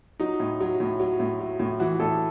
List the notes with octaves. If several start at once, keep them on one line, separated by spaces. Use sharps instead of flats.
F#3 D#4
A2
F#3
A2
F#3
A2
F#3
A2
E3 F#4
A2 A4